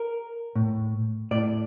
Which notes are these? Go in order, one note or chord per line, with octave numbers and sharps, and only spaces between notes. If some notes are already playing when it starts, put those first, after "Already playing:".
Already playing: A#4
A2
A2 D5